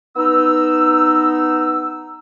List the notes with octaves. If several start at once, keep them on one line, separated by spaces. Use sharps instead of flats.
B3 D#4 E6